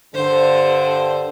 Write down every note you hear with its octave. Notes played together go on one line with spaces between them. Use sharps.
G2 D3 C5